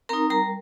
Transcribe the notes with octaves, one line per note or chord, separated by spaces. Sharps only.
C4 D#4 A#4 A#5
G3 A#4 A#5